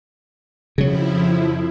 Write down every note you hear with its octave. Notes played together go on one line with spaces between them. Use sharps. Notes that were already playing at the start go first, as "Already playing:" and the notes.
F2 C#3 F3 F#3 E4